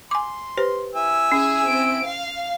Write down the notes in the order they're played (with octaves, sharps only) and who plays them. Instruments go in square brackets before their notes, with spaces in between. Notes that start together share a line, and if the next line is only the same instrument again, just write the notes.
[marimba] G#5 D6 [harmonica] C6
[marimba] G4 B4 C5
[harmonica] E4 G#5 E6
[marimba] C#4 [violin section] G#4
[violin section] C4 D7
F5